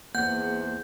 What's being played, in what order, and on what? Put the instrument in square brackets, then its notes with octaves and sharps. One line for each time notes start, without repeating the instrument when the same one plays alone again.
[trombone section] G#1 E2 C5 [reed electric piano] A#3 G#4 [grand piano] F#5 [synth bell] G6